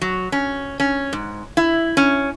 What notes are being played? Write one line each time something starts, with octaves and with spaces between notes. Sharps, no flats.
F#3
C#4
C#4
G#2
E4
C#4